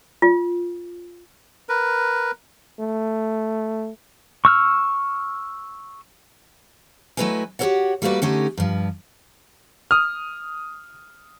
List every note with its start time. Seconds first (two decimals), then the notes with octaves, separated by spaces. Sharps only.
0.22 F4
1.69 A#4 B4
2.80 A3
4.45 C#6 E6 F6
7.17 F#3 A3 E4 B4 D#5 G#5
7.59 F#4 G4 A4 A#4 C#5 F#5
8.02 G3 A3 A#3 F#4 B4 D5
8.22 D3 A3 C#4 D#4 G4
8.58 G2 F3
9.91 D#6 F6